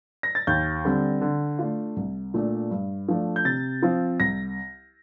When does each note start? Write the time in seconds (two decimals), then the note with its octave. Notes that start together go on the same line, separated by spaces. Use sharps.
0.23 A#6
0.35 A6
0.47 D#2 G6
0.85 D3 G3 C4
1.21 D3
1.59 A3 D4 F4
1.96 C2
2.34 A#2 A3 D4 F4
2.71 G2
3.08 F3 A3 D4
3.36 G6
3.45 C3 A6
3.83 F3 C4 F4
4.20 C2 A#6